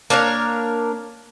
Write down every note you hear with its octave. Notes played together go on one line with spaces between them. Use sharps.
A#3 D4 A#4 C#5